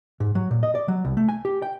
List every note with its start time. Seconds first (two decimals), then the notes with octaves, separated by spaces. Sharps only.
0.20 G#2
0.35 F#3
0.51 A#2
0.63 D#5
0.75 D5
0.88 F#3
1.05 C2
1.17 A3
1.29 G#5
1.45 G4
1.62 G5